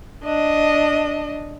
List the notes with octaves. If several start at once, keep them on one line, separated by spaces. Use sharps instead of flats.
D4 D#5